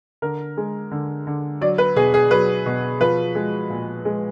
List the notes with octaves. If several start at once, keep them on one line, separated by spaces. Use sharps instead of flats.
D3 A#4
G#3
D3
D3
F#3 D5
B4
B2 G#4
G#4
F#3 B4
B2
F3 B4
G#3
A#2
G#3